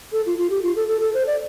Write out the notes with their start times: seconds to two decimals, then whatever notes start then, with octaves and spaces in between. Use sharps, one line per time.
0.12 A4
0.26 F4
0.38 F4
0.50 G4
0.63 F4
0.76 A4
0.89 A4
1.01 A4
1.14 C5
1.27 D5